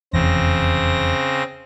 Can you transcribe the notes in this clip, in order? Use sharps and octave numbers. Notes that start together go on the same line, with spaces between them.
F1 E2 C#3 C4 A#6